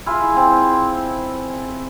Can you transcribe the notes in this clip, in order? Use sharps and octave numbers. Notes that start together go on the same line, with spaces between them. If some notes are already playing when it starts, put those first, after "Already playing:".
E4 F4 G#4
C4